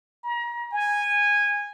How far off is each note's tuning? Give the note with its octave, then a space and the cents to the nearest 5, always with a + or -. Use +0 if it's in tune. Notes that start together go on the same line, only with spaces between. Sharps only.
A#5 +35
G#5 -15